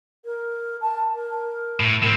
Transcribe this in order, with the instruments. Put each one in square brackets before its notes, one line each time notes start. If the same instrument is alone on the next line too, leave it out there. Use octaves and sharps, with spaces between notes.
[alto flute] A#4
A5
A#4
[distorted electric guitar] A2
[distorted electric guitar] A2 C4 [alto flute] A#4